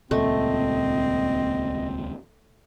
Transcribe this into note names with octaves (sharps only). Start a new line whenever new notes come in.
D#1 C#2 A#2 A3 C4 D#5